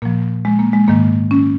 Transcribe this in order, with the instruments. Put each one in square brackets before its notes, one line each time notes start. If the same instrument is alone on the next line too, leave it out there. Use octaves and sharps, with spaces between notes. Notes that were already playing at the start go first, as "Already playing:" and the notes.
[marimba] A#2 F3 A#3
G#3
A#3
G#3
G#2 D#3 A#3
C#4